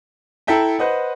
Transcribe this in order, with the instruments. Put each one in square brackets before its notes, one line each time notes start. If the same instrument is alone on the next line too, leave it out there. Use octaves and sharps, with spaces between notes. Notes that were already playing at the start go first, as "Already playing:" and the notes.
[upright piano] E4 A4 E5 G5 A#5
B4 C5 D#5 F#5